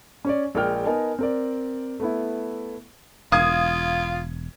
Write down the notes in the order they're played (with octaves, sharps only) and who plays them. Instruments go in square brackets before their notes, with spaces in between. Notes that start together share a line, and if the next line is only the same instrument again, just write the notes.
[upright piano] C#4 C#5 D5
A#1 G#3 A#4 G5 F6
B3 D#4 A#4 G#5 A5
C4 A#4 D5
A3 B3 E4
[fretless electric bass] E1 [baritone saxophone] F4 [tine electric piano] F5 [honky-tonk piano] D#6 G#6